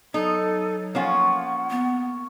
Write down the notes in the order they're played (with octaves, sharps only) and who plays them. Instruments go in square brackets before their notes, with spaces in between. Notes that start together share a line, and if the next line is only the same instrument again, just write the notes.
[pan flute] F#3 [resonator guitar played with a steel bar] D#4 [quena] A4
[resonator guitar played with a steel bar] F3 C#4 F4 [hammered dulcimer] A#3 C#5 C#6 [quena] F#5
[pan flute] B3